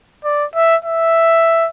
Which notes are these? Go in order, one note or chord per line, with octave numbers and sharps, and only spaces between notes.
D5
E5
E5